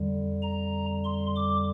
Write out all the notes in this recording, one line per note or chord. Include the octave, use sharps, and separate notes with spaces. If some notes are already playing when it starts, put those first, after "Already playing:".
Already playing: F2 D3 G3
A#5
C6
D6